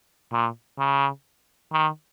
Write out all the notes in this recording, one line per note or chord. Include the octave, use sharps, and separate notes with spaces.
A#2
C#3
D#3